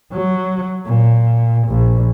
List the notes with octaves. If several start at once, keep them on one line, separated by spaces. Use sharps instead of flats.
F#3
A#2
A#1